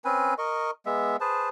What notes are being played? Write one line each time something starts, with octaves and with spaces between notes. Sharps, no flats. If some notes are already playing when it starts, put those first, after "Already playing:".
C4 C#4 B4 G#5
A#4 D#5 C#6
G#3 B3 E5
G#4 B4 C5 A5